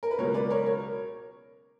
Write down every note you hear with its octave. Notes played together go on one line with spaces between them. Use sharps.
A#4
B4
C#2 B2 F#3 A#4 C#5
B4 D5
A#4 C#5
A#4 C#5